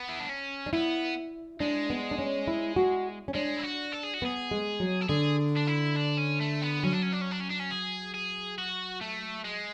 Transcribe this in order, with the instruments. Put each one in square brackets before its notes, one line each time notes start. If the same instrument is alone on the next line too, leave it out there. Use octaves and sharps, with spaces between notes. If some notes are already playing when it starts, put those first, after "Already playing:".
Already playing: [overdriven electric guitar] B3
E4
D4
C#4
[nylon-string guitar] D4
[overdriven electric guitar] B3 [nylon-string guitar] E4
[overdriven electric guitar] G#3 [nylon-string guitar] D4
[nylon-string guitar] B3
D4
C#4
E4
F#4
C#4
[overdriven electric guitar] G#3 [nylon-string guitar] D4
[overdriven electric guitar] E4
F#4
A4
G#4
F#4
[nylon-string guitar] B3 [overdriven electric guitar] G#4
[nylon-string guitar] G#3
F#3
[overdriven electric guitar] A4
[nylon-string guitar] D3 [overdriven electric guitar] G#4
[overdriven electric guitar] D4
E4
D4
C#4
A3
B3
[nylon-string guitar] F#3 [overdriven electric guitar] C#4
[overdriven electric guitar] D4
C#4
D4
C#4
D4
C#4
D4
C#4
G#4
G#4
F#4
A3
G#3